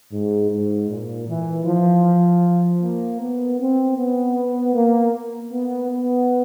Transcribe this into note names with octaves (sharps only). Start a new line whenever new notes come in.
G#2
G#2
A#2
E3
F3
A#3
B3
C4
B3
A#3
B3
B3